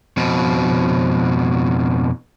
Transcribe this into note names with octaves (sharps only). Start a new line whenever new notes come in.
F2 B2